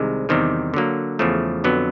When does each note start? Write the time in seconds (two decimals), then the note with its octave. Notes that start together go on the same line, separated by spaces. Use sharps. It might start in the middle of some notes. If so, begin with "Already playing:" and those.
Already playing: C2 C3 D#3 G#3
0.29 E2 C3 D#3 G3
0.74 D3 F#3 A#3
1.19 E2 C#3 F3 A3
1.64 F2 D3 F#3 B3